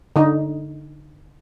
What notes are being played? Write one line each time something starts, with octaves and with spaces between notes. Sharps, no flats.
D3 D#4